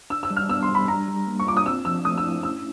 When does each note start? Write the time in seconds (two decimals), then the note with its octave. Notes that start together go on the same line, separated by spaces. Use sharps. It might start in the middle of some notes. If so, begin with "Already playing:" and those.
0.10 D4 E6
0.23 E6
0.31 G3
0.37 F6
0.49 B3 E6
0.63 C6
0.69 G3
0.75 B5
0.88 D4 A#5
1.08 G3
1.27 A#3
1.40 C#6
1.47 F4 D6
1.57 D#6
1.66 C4 E6
1.85 F3 E6
2.05 A3 D#6
2.18 E6
2.24 E4
2.43 C#4 E6